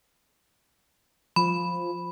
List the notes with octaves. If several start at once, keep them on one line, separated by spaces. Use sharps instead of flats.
F3 B5